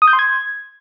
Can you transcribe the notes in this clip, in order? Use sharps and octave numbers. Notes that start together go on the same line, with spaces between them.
D#6
G6
C6
G#6